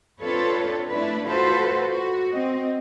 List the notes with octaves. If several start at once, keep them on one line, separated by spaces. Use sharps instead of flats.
C4 D4 F4 A4 B4 C#5
A3 D4 E4 B4
F4 F#4 A4 B4 C5
F#4
C4 D#5